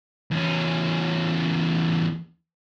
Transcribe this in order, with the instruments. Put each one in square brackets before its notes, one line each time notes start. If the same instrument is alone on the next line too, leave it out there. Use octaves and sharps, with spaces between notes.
[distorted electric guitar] E2 C#4